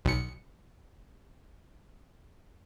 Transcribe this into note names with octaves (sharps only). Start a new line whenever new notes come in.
B1 C#7